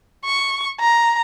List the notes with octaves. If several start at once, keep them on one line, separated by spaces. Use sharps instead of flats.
C#6
A#5